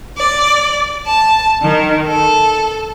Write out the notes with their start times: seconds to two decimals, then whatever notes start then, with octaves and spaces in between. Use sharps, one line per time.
0.17 D5
1.05 A5
1.61 D#3
2.05 A4